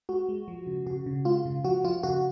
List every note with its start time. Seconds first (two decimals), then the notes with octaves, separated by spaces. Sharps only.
0.09 G#3 F#4
0.29 G#3
0.48 F3
0.67 C#3
0.86 C#3 F#4
1.06 C#3
1.25 G#3 F4
1.46 C#3
1.64 F3 F#4
1.84 F3 F4
2.03 C#3 F#4